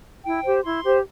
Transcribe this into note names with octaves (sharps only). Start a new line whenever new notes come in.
E4 G5
G4 C5
E4 C6
G4 C5